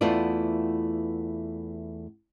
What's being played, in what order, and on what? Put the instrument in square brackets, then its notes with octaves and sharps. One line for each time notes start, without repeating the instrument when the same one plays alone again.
[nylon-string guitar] E2 A3 B3 E4 F4 D5